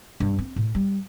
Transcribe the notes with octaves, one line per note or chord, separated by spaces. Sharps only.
G2
C4
A2
G3